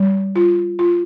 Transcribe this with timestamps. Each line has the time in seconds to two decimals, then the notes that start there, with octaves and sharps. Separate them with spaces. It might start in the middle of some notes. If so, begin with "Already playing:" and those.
Already playing: G3
0.36 F4
0.79 F4